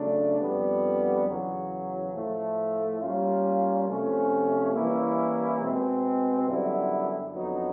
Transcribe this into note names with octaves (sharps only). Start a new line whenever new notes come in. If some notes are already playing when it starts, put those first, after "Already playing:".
Already playing: C#3 F#3 A3 D4
F2 D3 G3 B3
E2 C#3 F#3
A2 F3 A3
G3 A#3 C#4 F4
C3 F3 A3 C#4
E3 G3 A#3 C#4 E4
B2 G#3 C4
F#2 D3 G3 B3 E4
F2 D3 F#3 B3 D#4